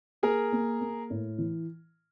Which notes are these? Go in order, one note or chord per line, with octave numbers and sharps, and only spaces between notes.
A#3 G#4 A#4
A#3
A#3
A2
E3